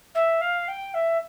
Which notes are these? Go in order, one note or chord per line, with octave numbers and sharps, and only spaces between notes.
E5
F5
G5
E5